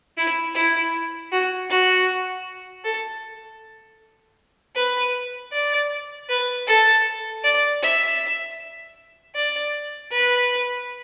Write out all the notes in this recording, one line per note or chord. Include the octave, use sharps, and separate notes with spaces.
E4
E4
F#4
F#4
A4
B4
D5
B4
A4
D5
E5
D5
B4